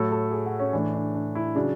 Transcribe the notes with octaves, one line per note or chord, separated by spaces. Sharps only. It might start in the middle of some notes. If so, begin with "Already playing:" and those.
Already playing: A2 F#3 A4
A4
G#4
F#4
C#4
A2 E3 D4
D4
D4
E4
C#3 F#3 D4